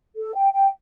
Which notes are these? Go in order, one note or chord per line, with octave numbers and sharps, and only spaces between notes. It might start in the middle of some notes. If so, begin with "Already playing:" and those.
A4
G5
G5